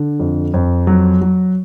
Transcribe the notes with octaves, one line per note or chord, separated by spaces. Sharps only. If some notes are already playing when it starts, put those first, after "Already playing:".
Already playing: D3
F2
F2
F#3
F#3